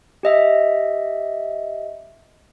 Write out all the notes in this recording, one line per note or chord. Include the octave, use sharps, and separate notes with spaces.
G4 D#5 E5